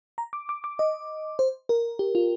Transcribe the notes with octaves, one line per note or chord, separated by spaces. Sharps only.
A#5
D6
D6
D6
D#5
C5
A#4
G4
F4